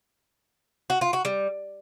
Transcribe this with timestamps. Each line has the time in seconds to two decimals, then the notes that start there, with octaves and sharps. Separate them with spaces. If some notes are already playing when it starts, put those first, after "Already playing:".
0.90 F#4
1.01 F4
1.13 F#4
1.25 G3